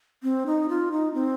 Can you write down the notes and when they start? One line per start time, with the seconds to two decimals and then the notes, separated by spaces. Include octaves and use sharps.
0.23 C4
0.46 D#4
0.69 F4
0.92 D#4
1.14 C4